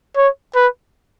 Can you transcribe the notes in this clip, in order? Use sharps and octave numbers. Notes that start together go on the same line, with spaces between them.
C#5
B4